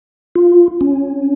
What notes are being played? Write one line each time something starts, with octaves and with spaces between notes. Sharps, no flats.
F4
C#4